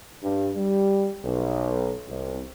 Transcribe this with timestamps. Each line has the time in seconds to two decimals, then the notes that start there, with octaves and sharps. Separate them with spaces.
0.22 G2
0.56 G3
1.25 B1
2.07 C2